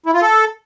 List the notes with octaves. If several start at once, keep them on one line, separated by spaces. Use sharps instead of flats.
E4
F4
A4